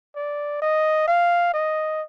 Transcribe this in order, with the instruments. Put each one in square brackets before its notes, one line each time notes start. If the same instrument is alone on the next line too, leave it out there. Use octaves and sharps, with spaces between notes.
[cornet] D5
D#5
F5
D#5